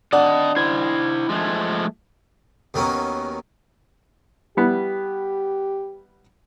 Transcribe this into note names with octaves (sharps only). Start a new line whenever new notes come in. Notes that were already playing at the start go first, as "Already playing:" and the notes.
D#3 D4 D5 D#5 F#5 A5
E4 C5 G#6
F3 G#3 A3
D#2 D#3 F#3 A#3 B3 C#4
G3 B3 E4 G4